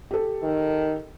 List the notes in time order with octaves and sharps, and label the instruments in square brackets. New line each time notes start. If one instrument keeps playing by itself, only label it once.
[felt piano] G4 A4
[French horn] D#3